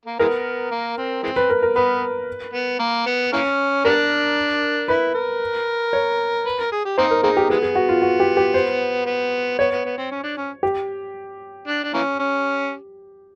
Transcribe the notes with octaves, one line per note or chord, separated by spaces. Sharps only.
A#3
E3 G#3 B3 A#4
A#3
C4
E3 G#3 C4
B4
A#4
A#4
B3 B4
B3
A#3
B3
E3 A#3 C#4
G3 B3 D4 A#4
E4 B4
A#4
C#5
B4
A#4
G#4
G4
A#3 C4 D#4 C5
A#4
A#3 C4 D#4 G#4
G4
E3 G#3 B3 G#4
G#4
F#4
F4
F#4
G4
G4
C5
B3
B3 C#5
B3
B3
C4
C#4
D4
C#4
G4
D4
D4
E3 A#3 C#4
C#4